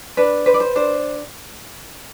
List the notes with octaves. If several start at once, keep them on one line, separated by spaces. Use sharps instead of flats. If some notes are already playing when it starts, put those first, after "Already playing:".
D4 B4
B4 C5
D5
C5
D4 C5